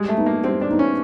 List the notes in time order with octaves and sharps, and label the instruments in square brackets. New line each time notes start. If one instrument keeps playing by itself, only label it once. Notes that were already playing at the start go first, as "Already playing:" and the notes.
Already playing: [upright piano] G3 [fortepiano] G#3
[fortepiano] A3
[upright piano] B3 D#4
[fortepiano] A#3
[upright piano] G3 [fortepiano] C4
[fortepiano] D4
[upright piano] B3 D#4
[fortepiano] C#4